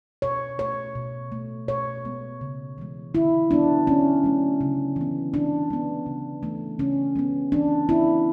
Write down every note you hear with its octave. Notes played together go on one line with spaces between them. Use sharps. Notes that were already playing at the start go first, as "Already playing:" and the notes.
B2 C#5
A3 C#5
B2
A3
B2 C#5
G#3 B3
C#3
E3 G#3
D3 E4
F#3 B3 D4
D3 C#4
F#3 A3
C#3
E3 B3
C#3 D4
G#3 B3
C#3
E3 A3
C#3 C#4
G#3 B3
E3 D4
B3 E4